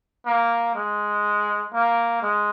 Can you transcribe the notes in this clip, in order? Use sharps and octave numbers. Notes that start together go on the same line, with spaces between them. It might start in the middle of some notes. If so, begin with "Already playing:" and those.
A#3
G#3
A#3
G#3